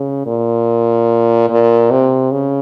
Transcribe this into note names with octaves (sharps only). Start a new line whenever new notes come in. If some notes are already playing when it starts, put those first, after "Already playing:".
Already playing: C#3
A#2
A#2
C3
C#3